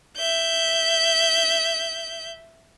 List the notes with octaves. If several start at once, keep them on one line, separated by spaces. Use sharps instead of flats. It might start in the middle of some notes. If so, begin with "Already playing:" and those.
E5 G6